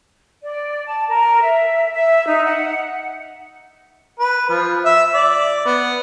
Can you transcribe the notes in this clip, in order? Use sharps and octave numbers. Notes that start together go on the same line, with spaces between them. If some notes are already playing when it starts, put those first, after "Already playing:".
D5
A5
A#4
E5
E5
D#4
F#5
B4
F3
E5
D5
B3